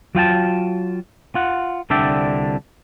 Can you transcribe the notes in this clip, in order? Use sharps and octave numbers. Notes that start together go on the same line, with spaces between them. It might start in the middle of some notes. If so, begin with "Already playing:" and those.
F#3 F4 G5 A5
F4 F#5
C2 D3 D4 D5 E5 G5